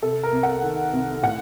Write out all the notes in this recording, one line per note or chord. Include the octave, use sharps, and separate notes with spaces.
C3 A4
A#4
C2
F#5
D#3
C2
A2 F#5